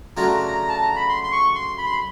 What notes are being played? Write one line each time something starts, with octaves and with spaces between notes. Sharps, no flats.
C#3 F#3 A3 D4 F4 A#5
A#5
A5
A#5
B5
C6
C6
C#6
C6
B5
C6
B5